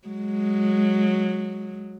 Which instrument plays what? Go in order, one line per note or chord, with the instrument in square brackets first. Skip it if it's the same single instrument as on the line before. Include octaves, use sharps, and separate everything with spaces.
[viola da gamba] F#3 G#3